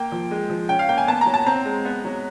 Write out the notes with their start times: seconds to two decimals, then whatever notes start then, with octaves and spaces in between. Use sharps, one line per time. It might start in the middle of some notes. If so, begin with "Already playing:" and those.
Already playing: A#3 G5
0.12 F3
0.31 G#3
0.50 F3
0.69 C#4 G5
0.79 F5
0.89 A#3 G5
0.98 G#5
1.07 B3 A5
1.21 A#5
1.26 F#3
1.34 A5
1.46 C4 A#5
1.65 G#3
1.85 B3
2.05 F#3